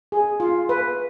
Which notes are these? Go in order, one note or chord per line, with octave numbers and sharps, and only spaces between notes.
G#4
F4
B4